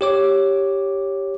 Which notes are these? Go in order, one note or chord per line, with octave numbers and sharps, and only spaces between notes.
G4 C#5 D6